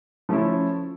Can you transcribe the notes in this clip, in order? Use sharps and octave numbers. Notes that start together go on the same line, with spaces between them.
F3 A3 C#4 E4